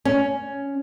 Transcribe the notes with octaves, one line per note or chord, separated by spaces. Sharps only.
C#4